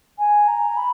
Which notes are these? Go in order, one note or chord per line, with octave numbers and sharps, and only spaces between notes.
G#5
A#5
B5